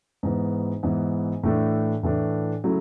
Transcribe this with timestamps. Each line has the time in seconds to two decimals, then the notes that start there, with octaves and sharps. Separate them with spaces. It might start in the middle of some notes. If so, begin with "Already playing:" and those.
0.23 G#2 E3 B3
0.83 G#2 E3 B3
1.43 A2 E3 A3 D4
2.03 A2 E3 A3 D4
2.64 C#3 F#3 A3 E4